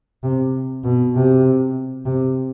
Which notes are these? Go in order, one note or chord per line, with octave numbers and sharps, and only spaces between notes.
C3
B2
C3
C3